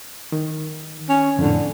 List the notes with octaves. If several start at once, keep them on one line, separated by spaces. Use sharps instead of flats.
D#3
C#4
F2 A2 D3